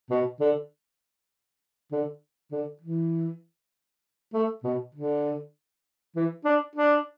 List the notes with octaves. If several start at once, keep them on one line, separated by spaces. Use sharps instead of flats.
B2
D3
D3
D3
E3
A3
B2
D3
E3
D4
D4